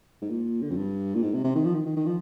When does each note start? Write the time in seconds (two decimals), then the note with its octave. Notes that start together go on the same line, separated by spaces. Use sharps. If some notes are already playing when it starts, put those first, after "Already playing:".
0.22 G#2
0.30 A#2
0.61 D3
0.71 F2
0.76 G2
1.15 A#2
1.23 G#2
1.34 C3
1.44 C3
1.55 D#3
1.64 F3
1.74 D#3
1.85 D#3
1.96 D#3
2.06 F3